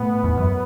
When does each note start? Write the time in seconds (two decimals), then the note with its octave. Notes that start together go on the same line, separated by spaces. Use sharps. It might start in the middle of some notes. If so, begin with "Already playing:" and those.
Already playing: A2 B3
0.24 E2
0.37 F#2